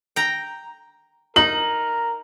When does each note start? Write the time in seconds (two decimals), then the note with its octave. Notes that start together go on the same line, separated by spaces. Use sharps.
0.16 G5 A#5
1.36 D#4 A#4 F#7